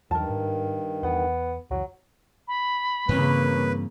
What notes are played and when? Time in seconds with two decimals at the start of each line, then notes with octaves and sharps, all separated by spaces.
0.11 E2 G2 D#3 E3 F#3 A#4 A5
0.29 G#2
1.03 E2 B3 F#5
1.71 C#2 F#2 E3 F#3
2.48 B5
3.09 G2 C#3 E3 A#3 C4 B4